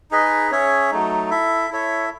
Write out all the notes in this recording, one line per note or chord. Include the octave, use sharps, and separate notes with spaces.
D#4 G#4 B4 D#5
C#4 G#4 C#5 E5
F#3 A3 D#4
E4 A4 E5
E4 A4 C#5 E5